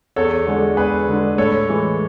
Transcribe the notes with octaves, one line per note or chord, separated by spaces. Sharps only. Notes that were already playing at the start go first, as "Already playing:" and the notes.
E2 A4 C#5
D3 G#3 D4
E2 G#4 B4
D3 G#3 D4
A2 A4 C#5
E3 G#3